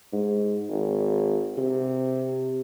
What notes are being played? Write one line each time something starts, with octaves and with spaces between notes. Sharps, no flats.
G#2
G#1
C3